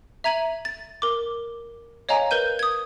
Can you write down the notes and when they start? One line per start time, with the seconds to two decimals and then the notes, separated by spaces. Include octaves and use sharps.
0.24 E5 A#5 G#6 D#7 F#7
0.65 A6
1.02 A#4 D6
2.09 C#5 D#5 F5 G#5 A#5
2.31 A#4 B4 G6 D#7
2.59 D#6 G#6